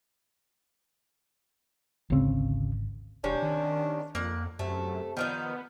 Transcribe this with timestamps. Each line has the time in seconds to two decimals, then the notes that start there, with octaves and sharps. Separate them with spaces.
2.10 G#1 D2 C#3 C4
3.24 E1 C3 C#4 D4
3.42 D#3
4.15 F2 A#3 F#5
4.59 F#2 C3 A3
5.17 D#3 F3 B3 D#4